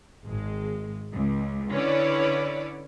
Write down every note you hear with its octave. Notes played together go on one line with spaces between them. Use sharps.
G#1 G#3
C#2
D3 C#4 E4 B4 C#5 D5